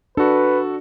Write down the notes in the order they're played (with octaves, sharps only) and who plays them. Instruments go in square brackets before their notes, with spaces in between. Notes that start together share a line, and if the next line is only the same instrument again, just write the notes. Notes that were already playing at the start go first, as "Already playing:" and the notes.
[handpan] D4 [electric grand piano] F#4 A4 [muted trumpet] B4